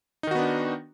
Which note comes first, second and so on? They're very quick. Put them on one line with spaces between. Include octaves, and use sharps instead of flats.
D#4 D#3 F#4 B3 D4